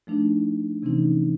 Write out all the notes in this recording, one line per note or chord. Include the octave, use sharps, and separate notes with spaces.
F3 A3 D4 D#4
C3 E3 C4 C#4 D#4